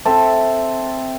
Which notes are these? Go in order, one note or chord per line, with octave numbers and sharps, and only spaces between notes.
C4 A4 E5